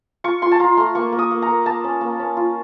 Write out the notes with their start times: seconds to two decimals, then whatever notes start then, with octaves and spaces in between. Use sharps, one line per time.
0.24 F4 C#6
0.42 F4 C6
0.52 A5
0.59 F4 A#5
0.77 A3 C6
0.95 A#3 C#6
1.12 A#3
1.19 D#6
1.31 A#3
1.42 A#5
1.48 A#3
1.66 A#3 A5
1.84 C#4
2.01 A#3
2.19 C#4
2.37 F4